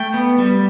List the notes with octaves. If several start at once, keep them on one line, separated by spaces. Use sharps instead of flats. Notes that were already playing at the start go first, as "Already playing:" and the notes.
Already playing: A3 G5
B3
G3